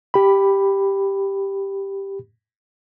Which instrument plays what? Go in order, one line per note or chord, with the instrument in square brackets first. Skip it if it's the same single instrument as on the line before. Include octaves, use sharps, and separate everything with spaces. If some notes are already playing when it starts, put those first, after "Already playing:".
[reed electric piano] G4 B5